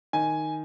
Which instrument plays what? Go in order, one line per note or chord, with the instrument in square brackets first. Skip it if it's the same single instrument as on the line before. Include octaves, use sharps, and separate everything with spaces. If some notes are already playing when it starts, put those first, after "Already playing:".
[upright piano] D#3 G#5